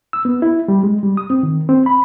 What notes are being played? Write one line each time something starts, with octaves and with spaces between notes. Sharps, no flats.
E6
B3
E4
G3
G#3
G3
D#6
C4
D#3
C4
B5